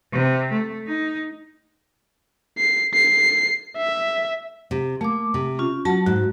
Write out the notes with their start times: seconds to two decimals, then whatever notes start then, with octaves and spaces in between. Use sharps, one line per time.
0.13 C3
0.53 A3
0.87 D#4
2.58 C7
2.94 C7
3.77 E5
4.71 C3
5.01 A3 A#3 D6
5.34 C3
5.59 C#4 F4
5.85 F#3 F#4 A5
6.06 G#2 F#4